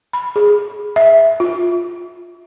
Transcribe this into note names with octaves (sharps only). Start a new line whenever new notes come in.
B5
G#4
E5
F4